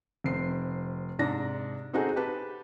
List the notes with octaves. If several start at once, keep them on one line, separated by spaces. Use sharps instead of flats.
F1 C4 C7
G#2 C3 D4 A#6
C4 D#4 F#4 G#4 A4
G4 B4 A5